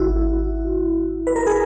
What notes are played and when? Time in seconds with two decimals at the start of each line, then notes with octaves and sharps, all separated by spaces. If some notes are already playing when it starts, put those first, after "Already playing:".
Already playing: G#1 D#3 E4 F#4
1.27 B4
1.36 A#4
1.47 G#4